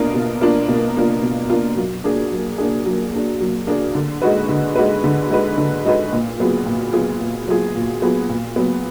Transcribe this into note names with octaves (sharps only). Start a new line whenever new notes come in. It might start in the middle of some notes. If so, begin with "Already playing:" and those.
Already playing: B2 A#3 D4 F4 A#4
B2
A#3 D4 F4 A#4
B2
A#3 D4 F4 A#4
B2
A#3 D4 F4 A#4
F#3
A#3 D4 G#4
F#3
A#3 D4 G#4
F#3
A#3 D4 G#4
F#3
A#3 D4 G#4
D3
G#3 D#4 F#4 B4
D3
G#3 D#4 F#4 B4
D3
G#3 D#4 F#4 B4
D3
G#3 D#4 F#4 B4
A#2
F#3 B3 F4 G#4
A#2
F#3 B3 F4 G#4
A#2
F#3 B3 F4 G#4
A#2
F#3 B3 F4 G#4
A#2
F#3 B3